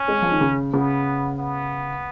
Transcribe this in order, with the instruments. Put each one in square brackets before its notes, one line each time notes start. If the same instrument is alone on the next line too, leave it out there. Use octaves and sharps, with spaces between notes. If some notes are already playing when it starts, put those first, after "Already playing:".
Already playing: [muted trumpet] C#4
[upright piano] G#3
F3
D#3
C#3
[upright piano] C#3 [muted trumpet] B3
[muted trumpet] B3